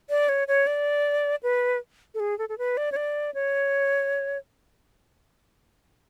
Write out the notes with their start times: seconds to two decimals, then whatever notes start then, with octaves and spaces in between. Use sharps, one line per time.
0.10 D5
0.29 C#5
0.48 C#5
0.67 D5
1.43 B4
2.14 A4
2.20 G#4
2.39 A4
2.49 A4
2.58 B4
2.77 D5
2.92 C#5
2.96 D5
3.34 C#5